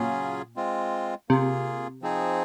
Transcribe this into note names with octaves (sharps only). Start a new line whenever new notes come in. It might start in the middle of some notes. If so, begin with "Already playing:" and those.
Already playing: A#2 C#3 F#3 C#4 F4 G#4
G#3 C4 F4
C3 A#3 F4 G#4
F3 C4 D#4 G#4